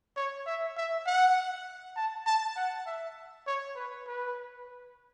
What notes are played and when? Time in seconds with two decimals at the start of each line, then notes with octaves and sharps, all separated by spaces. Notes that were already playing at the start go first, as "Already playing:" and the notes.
0.17 C#5
0.46 E5
0.77 E5
1.06 F#5
1.96 A5
2.26 A5
2.56 F#5
2.87 E5
3.47 C#5
3.76 B4
4.07 B4